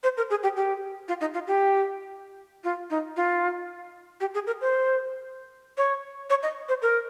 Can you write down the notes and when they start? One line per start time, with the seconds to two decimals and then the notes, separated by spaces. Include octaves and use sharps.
0.03 C5
0.17 A#4
0.30 G#4
0.43 G4
0.56 G4
1.08 F4
1.21 D#4
1.34 F4
1.47 G4
2.64 F4
2.90 D#4
3.17 F4
4.20 G4
4.34 G#4
4.47 A#4
4.61 C5
5.77 C#5
6.30 C#5
6.43 D#5
6.69 C5
6.82 A#4